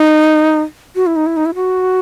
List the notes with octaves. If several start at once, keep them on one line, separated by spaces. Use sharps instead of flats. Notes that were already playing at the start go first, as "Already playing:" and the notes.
Already playing: D#4
F#4
E4
D#4
E4
D#4
E4
F#4